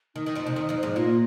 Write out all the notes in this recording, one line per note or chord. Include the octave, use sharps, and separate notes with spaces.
D#3 D#4
D#3
F2 F3
C3
D#3
F2 F3
G#2 G#3
A#2 A#3 F4